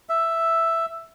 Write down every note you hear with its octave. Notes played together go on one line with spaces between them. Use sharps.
E5